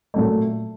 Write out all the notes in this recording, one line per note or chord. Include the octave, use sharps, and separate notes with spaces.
A#2 F#3 A3